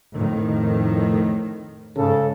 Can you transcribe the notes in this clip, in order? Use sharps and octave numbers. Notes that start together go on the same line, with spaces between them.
F2 A2 D#3
G#2 C#3 A4